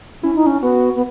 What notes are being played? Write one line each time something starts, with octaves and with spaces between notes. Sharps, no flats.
C#4 E4
D#4
C#4
B3 F#4
B3